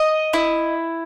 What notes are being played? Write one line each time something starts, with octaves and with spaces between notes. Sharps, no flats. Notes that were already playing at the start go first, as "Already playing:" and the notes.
Already playing: D#5
E4